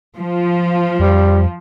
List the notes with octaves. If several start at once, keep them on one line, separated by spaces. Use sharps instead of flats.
F3
F2 G3